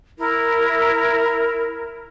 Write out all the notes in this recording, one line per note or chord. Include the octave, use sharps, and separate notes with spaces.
E4 A#4